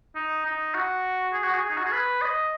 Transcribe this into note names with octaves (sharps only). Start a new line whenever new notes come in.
D#4
D#4
F#4
G#4
F#4
G#4
D#4
F#4
G#4
B4
D#5